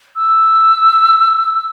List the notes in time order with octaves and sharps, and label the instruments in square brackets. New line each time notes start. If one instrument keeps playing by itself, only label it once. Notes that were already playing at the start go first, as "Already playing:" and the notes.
[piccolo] E6